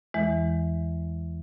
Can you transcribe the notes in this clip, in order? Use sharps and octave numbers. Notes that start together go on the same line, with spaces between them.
E2 E3 G#3